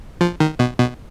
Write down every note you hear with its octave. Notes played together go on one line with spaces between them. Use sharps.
F3
D#3
B2
B2